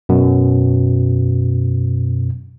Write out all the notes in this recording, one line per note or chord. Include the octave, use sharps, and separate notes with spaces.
F#2 B2